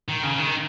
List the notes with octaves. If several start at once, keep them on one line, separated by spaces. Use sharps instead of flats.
D#3
C#3
D#3